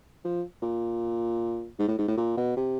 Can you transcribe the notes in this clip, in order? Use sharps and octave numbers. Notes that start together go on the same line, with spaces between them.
F3
A#2
G#2
A2
G#2
A2
A#2
B2
C3